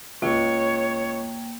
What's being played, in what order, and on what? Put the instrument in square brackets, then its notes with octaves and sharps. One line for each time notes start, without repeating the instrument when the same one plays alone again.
[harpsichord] C#2 [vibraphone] A#3 G5 [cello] C#5